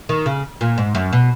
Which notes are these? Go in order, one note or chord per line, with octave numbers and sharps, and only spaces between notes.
D#3
C#3
A#2
G#2
F#2
B2